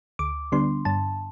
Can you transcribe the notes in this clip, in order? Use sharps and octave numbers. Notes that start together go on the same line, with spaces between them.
D2 D6
D3 G3 B3 D4 C6
G2 A5